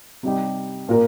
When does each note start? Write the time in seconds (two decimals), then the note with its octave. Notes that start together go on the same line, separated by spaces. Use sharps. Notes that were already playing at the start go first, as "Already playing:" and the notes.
0.23 C3 G3 D#4 G4
0.89 A#2 A#3 F4 A#4